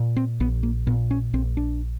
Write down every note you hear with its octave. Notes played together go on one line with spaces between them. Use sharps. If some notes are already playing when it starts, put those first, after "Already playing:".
Already playing: A#2
C4
A#1 B3
A#3
A#2 B3
C#4
A#1 C4
D4